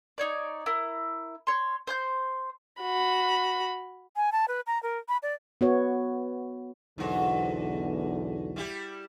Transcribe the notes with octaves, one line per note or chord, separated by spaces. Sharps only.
D#4 C#5 D5
E4 A#4
C#5 C6
C5 C6 G6
F#4 B5
G#5
A5
B4
A#5
A#4
B5
D5
B3 F#4 C#5
B1 E2 G#2 D3 F#4
G3 E4 G4